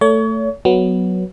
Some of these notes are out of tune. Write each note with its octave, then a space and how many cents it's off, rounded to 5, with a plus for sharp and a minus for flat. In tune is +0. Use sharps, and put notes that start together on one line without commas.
A3 +15 C#5 +35
F#3 +0 B3 +0